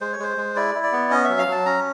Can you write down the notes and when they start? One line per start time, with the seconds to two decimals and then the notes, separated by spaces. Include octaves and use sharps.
0.01 G#3 C5
0.12 C#5
0.19 G#3 C5
0.37 G#3
0.56 E4 D5
0.75 E4
0.83 D5
0.92 B3
1.11 C#4 D#5
1.24 F#3 E5
1.38 F5
1.47 F#3 A5
1.66 C#4 A#5